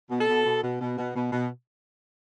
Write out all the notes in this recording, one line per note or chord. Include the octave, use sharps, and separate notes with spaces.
B2
A4
B2
B2
B2
B2
B2
B2
B2